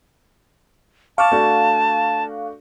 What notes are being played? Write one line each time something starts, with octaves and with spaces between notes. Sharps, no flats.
F5 A5 C#6 D6 F6
A3 D4 F#4